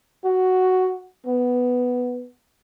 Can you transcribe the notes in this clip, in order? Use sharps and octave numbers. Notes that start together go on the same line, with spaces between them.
F#4
B3